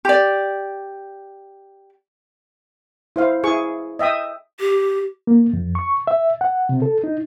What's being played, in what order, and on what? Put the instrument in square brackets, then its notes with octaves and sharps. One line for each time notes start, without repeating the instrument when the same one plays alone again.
[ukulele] G4 D5
[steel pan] E4 C5 F5
E4 G#4 C#6
D#5 E5 G5 D#6
[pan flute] G4
[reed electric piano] A#3
F2
C#6
E5
F#5
C3
A4
D#4